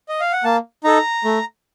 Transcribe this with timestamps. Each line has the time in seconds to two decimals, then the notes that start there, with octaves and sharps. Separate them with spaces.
0.09 D#5
0.20 F5
0.32 F#5
0.44 A#3 A5
0.84 D#4 A4 A#5
1.25 A3